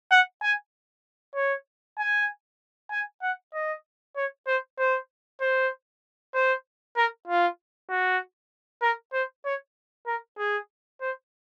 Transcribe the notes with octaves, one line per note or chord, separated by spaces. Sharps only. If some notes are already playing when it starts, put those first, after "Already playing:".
F#5
G#5
C#5
G#5
G#5
F#5
D#5
C#5
C5
C5
C5
C5
A#4
F4
F#4
A#4
C5
C#5
A#4
G#4
C5